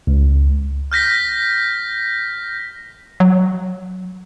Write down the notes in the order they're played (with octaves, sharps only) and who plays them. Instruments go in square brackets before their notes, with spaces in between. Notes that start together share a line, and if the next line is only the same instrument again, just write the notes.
[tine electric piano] C#2
[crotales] F6 G6 A#6 B6
[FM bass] F#3